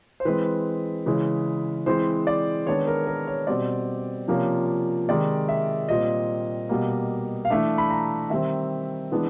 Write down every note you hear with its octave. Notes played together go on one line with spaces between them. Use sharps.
C5
E3 G#3 C4 B4
C#3 E3 G#3
E3 G#3 C4 C5
D5
D#3 G#3 B3 D4 C#5
A#4
A#4
C#5
B2 G3 C4 D5
C3 F3 A#3 C#4
C3 D#3 G#3 D5
E5
A#2 G3 C4 D#5
B2 G3 A#3
F5
E3 A3 D4 E5
B5
A#5
D#3 G3 C4 E5
E3 G#3 B3 D4